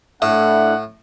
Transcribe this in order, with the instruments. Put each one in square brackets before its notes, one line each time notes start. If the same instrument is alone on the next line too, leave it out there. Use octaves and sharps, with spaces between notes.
[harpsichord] A2 [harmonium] A3 D4 E4 [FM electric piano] E5 [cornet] F#5